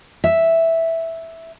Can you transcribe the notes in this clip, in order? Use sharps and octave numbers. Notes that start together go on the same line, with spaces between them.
E5